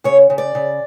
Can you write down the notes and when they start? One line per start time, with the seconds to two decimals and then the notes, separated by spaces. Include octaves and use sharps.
0.04 C#3 C#5
0.30 C#3
0.38 D5
0.55 C#3